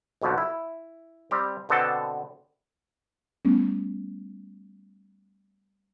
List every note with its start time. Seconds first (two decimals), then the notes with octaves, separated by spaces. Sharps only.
0.22 B1 F2 B2 D3 F3
0.38 E4
1.31 G3 C4 G4
1.69 B2 D3 B3 C4 A4 A5
3.45 G3 A3 B3 C#4